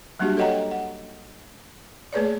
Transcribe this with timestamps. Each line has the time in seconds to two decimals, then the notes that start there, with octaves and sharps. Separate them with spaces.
0.19 F#3 G3 A#3 D4 F#4 G4
0.37 A4 C#5 D#5 F#5 G5 A#5
0.71 F#5
2.13 A3 A#3 G#4 B4 C#5 D5